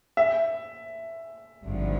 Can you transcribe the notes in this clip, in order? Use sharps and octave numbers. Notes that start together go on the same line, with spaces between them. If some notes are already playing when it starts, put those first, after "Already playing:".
E5
G#1 G2 D3 F3